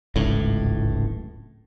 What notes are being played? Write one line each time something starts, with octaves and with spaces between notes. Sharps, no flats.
D1 G#1 C#2 A2